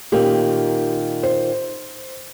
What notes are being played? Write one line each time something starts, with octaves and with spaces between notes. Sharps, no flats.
A#2 D#3 C#4 G4
C5